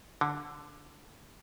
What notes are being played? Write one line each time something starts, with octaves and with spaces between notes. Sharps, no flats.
D3